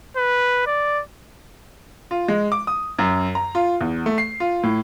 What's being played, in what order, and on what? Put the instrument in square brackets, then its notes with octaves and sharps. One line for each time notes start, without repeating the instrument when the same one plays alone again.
[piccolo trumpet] B4
D5
[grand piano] F4
G#3
D6
D#6
F#2
A#5
F4
E2
A3
C7
F4
A2